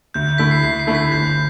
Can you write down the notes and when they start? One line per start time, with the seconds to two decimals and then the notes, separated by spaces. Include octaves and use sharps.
0.14 D2 G6
0.38 D3 A3 E4 B6
0.51 C7
0.63 D2 C7
0.79 C7
0.87 D3 A3 E4
0.95 B6
1.11 G1 G6